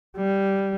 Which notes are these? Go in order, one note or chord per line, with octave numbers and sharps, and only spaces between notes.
G3